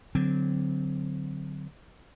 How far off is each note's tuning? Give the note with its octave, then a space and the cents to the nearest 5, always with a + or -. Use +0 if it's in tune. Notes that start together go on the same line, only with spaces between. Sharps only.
D3 +0 F#3 +0 C4 -15